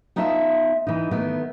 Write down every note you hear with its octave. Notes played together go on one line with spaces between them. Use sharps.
B3 D#4 F4 C#5 E5 A5
E3 D#4
D#3 A3 B3